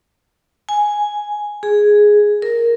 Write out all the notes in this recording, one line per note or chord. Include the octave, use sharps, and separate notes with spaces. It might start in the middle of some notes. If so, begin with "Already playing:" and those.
G#5
G#4
A#4